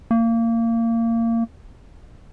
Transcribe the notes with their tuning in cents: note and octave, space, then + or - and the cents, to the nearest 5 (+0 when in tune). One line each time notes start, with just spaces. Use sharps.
A#3 -25